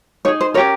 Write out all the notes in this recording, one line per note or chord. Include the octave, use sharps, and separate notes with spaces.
D#4 G#4 C#5
C5
C#4 G4 A#4 C#5